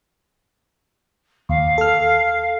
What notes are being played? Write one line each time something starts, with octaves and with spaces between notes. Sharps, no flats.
D#2 F5
A4 F6